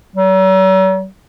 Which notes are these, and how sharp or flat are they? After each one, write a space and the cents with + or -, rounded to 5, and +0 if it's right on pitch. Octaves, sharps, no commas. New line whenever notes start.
F#3 +45